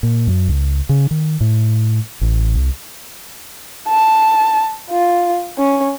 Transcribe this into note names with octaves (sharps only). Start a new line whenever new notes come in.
A#2
F#2
C#2
C#3
D#3
A2
A1
C2
A5
F4
C#4